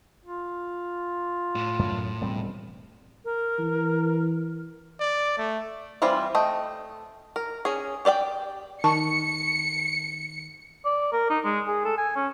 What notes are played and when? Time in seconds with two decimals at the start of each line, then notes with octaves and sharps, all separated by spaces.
0.25 F4
1.55 A2
1.79 F#2
2.21 E1 G3 C4
3.25 A#4
3.59 E3
5.00 D5
5.38 A3
6.02 E3 G3 C4 E4 F4
6.35 A3 D#5 G5
7.36 A#4
7.65 C#4 G#4
8.05 G4 D5 D#5 G5
8.84 D#3 A5 C#6 C#7
10.85 D5
11.13 A#4
11.30 D#4
11.45 G#3
11.67 G#4
11.85 A4
11.98 G#5
12.16 C#4